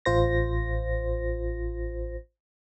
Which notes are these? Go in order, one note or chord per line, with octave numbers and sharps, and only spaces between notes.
A1 F4 C5 A#6